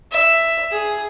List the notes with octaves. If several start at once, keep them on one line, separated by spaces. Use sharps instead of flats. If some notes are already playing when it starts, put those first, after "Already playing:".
E5
G#4